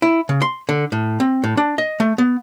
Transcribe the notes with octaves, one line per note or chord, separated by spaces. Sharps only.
E4
C#3
C6
D3
A2
C4
A2
D4
D#5
A3
B3